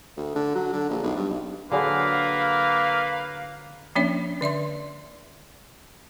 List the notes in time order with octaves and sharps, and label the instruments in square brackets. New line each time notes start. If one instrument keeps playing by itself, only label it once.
[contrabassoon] D2
D3
F#3
D3
A#1
B1
G2
B1
[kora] D3 F#3 G#4 [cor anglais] A#3 [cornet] B4 [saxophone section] F5
[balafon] F3 A#3 C#4 D4 C#5 E5
D3 D5 E5 C6